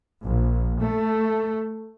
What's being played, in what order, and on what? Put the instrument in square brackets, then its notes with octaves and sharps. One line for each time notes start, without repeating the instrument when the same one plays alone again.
[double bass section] A#1
A3